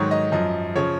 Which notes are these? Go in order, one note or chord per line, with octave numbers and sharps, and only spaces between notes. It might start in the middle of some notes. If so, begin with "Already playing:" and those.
Already playing: G#2 D#3 F#3 C#5
D#5
F#2 F3 D#5
C#3 F3 C#5